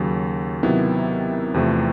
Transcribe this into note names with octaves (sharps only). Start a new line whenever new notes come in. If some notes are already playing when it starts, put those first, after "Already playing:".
Already playing: D#2 C#3 F#3
C3 D#3 F#3 B3 E4
E2 C3 F3 A3